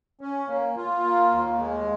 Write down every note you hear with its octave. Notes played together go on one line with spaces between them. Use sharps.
C#4
A#3
F4
A#3
D#2
G#3